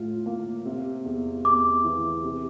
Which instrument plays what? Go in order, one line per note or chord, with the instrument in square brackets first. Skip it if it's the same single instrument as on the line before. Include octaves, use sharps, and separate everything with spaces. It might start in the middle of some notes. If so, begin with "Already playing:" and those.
Already playing: [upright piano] A2 F4
A#3
C3
E2
[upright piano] E2 [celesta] D6
[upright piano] E3
C3